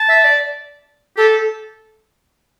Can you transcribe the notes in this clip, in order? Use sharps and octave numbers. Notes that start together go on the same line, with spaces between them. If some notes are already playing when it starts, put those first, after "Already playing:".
Already playing: A5
E5
D5
G4 A4